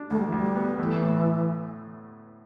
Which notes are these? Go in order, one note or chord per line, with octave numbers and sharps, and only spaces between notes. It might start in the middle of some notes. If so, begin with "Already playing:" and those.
Already playing: D4
D2 A3
G3
E3
D2 G3
B3
E3 A3
A2